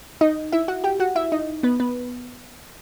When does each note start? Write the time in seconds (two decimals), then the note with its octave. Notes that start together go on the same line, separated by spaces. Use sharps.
0.21 D#4 D#5
0.52 E4 E5
0.68 F#4 F#5
0.84 G4 G5
1.00 F#4 F#5
1.16 E4 E5
1.32 D#4 D#5
1.63 B3 B4
1.80 B3 B4